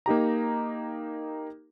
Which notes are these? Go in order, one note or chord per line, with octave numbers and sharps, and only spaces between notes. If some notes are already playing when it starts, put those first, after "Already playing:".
A#3 D#4 G4 A#5